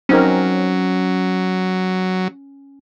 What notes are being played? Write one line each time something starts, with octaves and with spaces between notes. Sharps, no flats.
F#3 C4 C#4 D#4 A#4